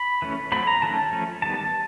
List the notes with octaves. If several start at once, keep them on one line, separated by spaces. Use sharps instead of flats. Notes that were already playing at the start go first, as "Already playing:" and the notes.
Already playing: B5
E3 A3 C#4
F#3 A3 C4 B5
A#5
D#3 F#3 A3 C#4 A5
F3 A3 C#4
D#3 G3 B3 A5